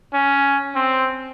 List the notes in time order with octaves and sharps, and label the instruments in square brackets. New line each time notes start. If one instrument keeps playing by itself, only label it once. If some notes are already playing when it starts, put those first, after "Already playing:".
[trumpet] C#4
C4